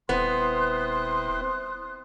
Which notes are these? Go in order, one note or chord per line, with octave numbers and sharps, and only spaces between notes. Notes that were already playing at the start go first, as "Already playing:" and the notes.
D#1 B3 C4 E4 C5 C6 D#6 F#6